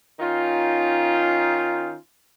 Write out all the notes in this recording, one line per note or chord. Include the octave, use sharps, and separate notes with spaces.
D#3 C#4 D#4 F4